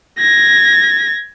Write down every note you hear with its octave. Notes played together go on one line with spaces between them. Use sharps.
G#6 A#6